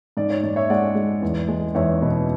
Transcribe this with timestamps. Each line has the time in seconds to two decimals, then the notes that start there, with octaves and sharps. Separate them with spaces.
0.17 G#2 D5
0.30 C#5
0.44 G#2 D5
0.56 C#5 E5
0.70 G#3 D5 F#5
0.96 G#3
1.22 E2
1.48 G#3
1.75 E2 C#5 E5
2.02 B2